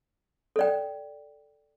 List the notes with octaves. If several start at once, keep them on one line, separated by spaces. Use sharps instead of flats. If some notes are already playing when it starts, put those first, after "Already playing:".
A4 D5 G5